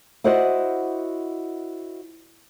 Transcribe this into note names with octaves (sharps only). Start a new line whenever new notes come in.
E4 F#4 C5 D5 D#5 F#5